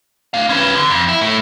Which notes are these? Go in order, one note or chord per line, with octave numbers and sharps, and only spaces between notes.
D4 F5
C#4 B4
D3
F2
E4
A2 A3